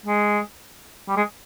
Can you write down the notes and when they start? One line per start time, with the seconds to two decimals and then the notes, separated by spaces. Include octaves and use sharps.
0.06 G#3
1.08 G3
1.16 G#3